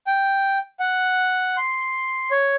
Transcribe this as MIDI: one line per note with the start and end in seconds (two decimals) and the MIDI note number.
0.07 0.58 79
0.80 1.56 78
1.57 2.31 84
2.31 2.56 73